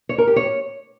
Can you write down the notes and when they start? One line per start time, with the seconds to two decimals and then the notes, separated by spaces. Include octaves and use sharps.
0.09 C#5
0.18 A#4
0.27 G4
0.36 C#5